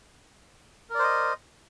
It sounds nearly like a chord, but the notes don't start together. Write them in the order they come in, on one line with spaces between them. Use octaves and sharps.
A#4 D5 C5 D#5